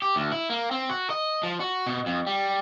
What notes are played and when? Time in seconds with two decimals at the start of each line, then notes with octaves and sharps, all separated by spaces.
0.02 G4
0.16 D2
0.32 E4
0.50 A#3
0.71 C4
0.90 F#4
1.10 D#5
1.43 F3
1.60 F#4
1.87 B2
2.06 F2
2.27 G3